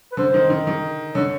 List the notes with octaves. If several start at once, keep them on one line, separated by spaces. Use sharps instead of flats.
B4
D3 C5
D#3
D#3
D#3
D3 C#5